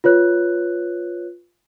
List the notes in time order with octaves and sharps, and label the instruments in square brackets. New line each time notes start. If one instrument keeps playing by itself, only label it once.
[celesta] F4 B4 C#5 F#6